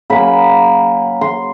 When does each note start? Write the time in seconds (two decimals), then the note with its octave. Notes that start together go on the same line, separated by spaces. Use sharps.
0.10 C#3 F#3 A#3 B5
1.21 C6